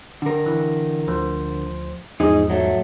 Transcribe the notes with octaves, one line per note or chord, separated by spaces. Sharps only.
D3 A#4
E3 E4
D2 F3 C5
E2 G#2 F3 D#4 G#4 D#5
F#3 A3